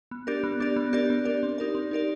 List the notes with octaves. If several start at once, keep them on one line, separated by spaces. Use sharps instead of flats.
B3
D4 G4 A#4 D5
B3
D4 G4 A#4 D5
B3
D4 G4 A#4 D5
B3
D4 G4 A#4 D5
C4
D#4 G4 A#4 D5
C4
D#4 G4 A#4 D5